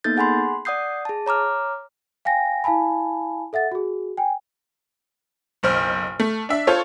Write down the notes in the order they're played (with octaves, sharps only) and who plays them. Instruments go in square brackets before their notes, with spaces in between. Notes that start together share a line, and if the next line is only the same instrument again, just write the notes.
[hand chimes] A#3 B3 D#4 A4 G6 A6
G#4 F#5 G#5 B5 C6
D5 F#5 D#6 G6 C7
G#4 A5
C#5 A#5 D6 F6
[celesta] F5 G5 G#5 A#6
E4 F5 G#5 A5 B5
A4 E5 F#5 A6
F#4 G#4
G5 G#5
[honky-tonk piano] F#1 B1 C5 F6
A3
D4 E5
F4 A4 C5 C#5